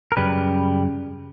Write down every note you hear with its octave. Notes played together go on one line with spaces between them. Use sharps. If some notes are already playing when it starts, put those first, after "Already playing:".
A#4
F#2 C#3 G3 B4